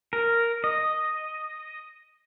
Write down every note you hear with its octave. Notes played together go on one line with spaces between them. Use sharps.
A#4
D#5